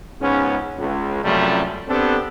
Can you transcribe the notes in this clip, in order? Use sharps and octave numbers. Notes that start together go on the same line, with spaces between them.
C#2 G#2 B3 C#4
C#2
C#2 F#2 C3 F3 G3 A3
B3 C4 D4 G4 A4